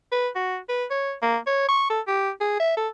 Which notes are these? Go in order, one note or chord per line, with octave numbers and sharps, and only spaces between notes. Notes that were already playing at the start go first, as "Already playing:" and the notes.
B4
F#4
B4
C#5
A#3
C#5
C#6
A4
G4
G#4
E5
A4